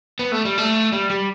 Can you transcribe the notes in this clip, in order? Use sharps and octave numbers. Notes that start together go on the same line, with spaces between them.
B3
A3
G3
A3
G3
G3